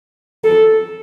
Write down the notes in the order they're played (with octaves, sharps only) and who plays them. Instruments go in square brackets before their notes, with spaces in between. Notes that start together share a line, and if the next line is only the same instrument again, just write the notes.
[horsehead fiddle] A4